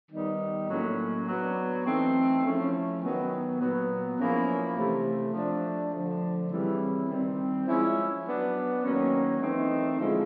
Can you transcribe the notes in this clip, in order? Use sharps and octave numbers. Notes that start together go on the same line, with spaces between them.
D#3 G3 B3 D#4
A2 F#3 A#3 C#4
F#3 B3 D4
E3 A3 C4 D#4
F3 A3 C#4 E4
D#3 F#3 B3
A#2 F#3 B3
F3 A#3 C#4 E4
C3 E3 A3
F3 A3 D4
D3 F3 A3
C#3 E3 G3 C4 E4
D#3 G3 C4
F3 G#3 C#4 E4
F#3 B3 D4
D#3 F#3 A#3 C#4
E3 A3 C4 D#4
D3 F3 G#3 C#4 E4